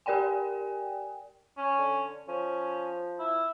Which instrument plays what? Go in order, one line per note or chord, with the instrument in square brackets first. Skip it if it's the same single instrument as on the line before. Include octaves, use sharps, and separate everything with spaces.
[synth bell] G4 A#4 D5 G5 G#5
[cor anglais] C#4
[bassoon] D3
[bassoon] F3 [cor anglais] C#4
[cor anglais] E4